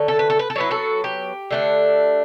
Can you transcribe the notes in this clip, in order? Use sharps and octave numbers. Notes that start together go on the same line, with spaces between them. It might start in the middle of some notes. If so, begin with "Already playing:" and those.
Already playing: D3 F#3 A3
A4
B4
A4
B4
A4
F#3 B3 E4 B4
F#4 A4
G4
D3 A3 D4